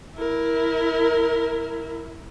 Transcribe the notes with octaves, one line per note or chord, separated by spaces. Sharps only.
E4 A#4